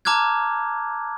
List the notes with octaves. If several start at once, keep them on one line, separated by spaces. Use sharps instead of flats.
A5 A#5 D6 F6 F#6 G#6